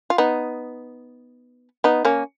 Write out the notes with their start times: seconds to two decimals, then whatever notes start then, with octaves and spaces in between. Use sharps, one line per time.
0.10 F4
0.18 B3 D#4
1.84 B3 D#4
2.05 A#3 C#4